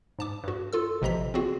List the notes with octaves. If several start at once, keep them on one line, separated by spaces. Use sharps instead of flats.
G#2 A5 D6
G2 F#4
F4 A4 E6
A1 C3 F3 D#5 A#5 B6
C4 F4 F#4 G#4